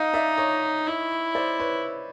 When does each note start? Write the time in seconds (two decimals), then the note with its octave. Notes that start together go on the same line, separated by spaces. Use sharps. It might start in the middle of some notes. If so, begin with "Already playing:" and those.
Already playing: D#4 D#5 F5
0.13 D5 E5
0.37 C#5 D#5
0.87 E4
1.35 C5 D5
1.60 B4 C#5